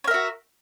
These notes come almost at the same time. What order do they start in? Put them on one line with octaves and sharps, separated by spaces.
C#5 A#4 E5 F#4